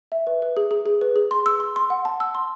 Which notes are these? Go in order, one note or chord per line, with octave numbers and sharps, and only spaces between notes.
E5
B4
B4
G#4
G#4
G#4
B4
G#4
C6
E6
C6
C6
F#5
A5
E6
C6